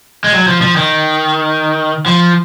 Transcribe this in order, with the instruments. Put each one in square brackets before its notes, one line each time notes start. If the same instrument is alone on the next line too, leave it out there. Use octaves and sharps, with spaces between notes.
[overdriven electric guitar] G#3
F#3
F3
F3
D#3
F3